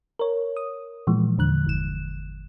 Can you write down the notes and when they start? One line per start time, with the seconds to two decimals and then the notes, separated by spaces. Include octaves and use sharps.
0.19 A#4 C#5
0.57 D#6
1.07 A#2 E3 F3 G#3
1.38 E2 D3 F#6
1.67 G1 E7